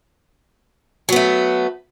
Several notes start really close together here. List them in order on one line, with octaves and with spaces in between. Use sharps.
F#3 B3 A3